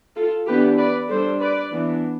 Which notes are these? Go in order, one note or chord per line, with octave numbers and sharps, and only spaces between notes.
F4 A4
E3 B3 D4 G4 B4
B4 D5
G3 D4 A4 C5
B4 D5
E3 B3 D4